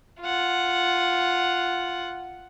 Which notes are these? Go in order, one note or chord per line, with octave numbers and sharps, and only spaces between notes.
F4 F#5